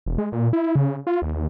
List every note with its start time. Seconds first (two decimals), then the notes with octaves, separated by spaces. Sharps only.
0.06 E1
0.18 G#3
0.32 A#2
0.53 E4
0.75 C#3
1.07 F4
1.22 D#2